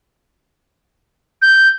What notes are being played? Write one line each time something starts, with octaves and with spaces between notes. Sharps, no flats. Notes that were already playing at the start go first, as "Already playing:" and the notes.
G6